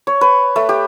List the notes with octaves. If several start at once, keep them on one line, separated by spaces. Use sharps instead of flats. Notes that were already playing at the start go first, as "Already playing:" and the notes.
C#5
B4
A3
G4